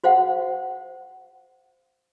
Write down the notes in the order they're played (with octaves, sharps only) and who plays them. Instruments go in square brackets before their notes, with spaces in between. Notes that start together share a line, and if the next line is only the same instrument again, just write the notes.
[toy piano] F#4 C5 F5 F#5